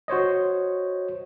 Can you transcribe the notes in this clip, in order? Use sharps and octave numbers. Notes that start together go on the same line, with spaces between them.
F#4 C5 C#5 D#5